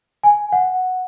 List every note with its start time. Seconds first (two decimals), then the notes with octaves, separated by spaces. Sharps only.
0.23 G#5
0.52 F#5